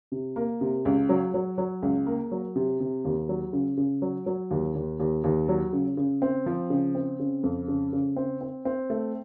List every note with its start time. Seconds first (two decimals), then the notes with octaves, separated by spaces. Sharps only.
0.12 C3
0.36 A#3
0.61 C3
0.85 C#2
1.09 F#3
1.34 F#3
1.58 F#3
1.82 C#2
2.06 A#3
2.32 F#3
2.56 C3
2.80 C3
3.05 D#2
3.29 F#3
3.53 C#3
3.77 C#3
4.02 F#3
4.26 F#3
4.51 D#2
4.75 D#2
5.00 D#2
5.24 D#2
5.49 F#3
5.73 C#3
5.97 C#3
6.22 C4
6.46 F3
6.70 C#3
6.95 C4
7.20 C#3
7.43 F2
7.68 C#3
7.93 C#3
8.16 C4
8.41 C4
8.65 C4
8.90 A3